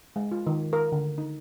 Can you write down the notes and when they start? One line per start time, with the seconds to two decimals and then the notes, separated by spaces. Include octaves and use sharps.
0.16 G#3
0.32 F4
0.47 D#3
0.73 A#4
0.92 D3
1.18 D#4